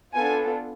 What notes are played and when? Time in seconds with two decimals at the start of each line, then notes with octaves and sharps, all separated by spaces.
0.14 B3 D4 F4 A4 G#5